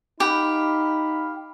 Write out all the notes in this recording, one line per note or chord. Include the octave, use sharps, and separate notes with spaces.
D#4 G4 F5 F#5 B5